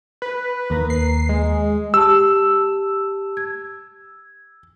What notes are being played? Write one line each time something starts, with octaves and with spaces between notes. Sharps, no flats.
B4
D#2 A#3 A#5
C7
G#3
G4 A5 E6
G#6